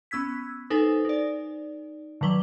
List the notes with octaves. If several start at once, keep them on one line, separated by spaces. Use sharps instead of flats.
B3 C#4 E6 G#6 B6
D#4 A4 B4 C5 G#5
D#4 D5
D3 D#3 F#3 B4 D6 G7